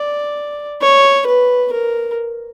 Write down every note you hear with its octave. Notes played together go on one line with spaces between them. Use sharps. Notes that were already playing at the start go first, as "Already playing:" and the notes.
Already playing: D5
C#5
B4
A#4